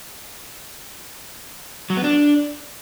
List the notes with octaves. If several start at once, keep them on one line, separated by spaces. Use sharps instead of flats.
F#3
B3
D4